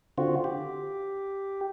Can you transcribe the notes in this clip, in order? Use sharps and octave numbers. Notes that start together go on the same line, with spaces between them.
D3 C4 F4 F#4
G4